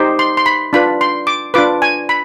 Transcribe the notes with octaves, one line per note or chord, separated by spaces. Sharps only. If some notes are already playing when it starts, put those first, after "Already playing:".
Already playing: D#4 G4 C5
C6
C6
B5
D4 F4 B4 B5
C6
D6
D4 F4 B4 D6
G#5
B5